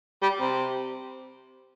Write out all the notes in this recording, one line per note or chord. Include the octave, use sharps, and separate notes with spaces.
G3
C3